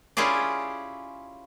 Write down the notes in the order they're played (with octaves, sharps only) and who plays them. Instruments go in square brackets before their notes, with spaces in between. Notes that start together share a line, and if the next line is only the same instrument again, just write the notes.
[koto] C#4 E4 F4 G4 G#4 D5